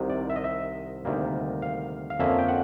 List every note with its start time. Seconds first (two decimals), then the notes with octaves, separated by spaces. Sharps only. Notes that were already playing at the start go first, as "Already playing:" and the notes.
Already playing: C2 C3 D#3
0.10 D5
0.30 E5
0.36 D#5
0.44 E5
1.05 D2 C3 D#3 G3 A#3
1.62 F5
2.10 F5
2.19 F2 D3 F3 A#3 C#4 E5
2.38 G5
2.48 F#5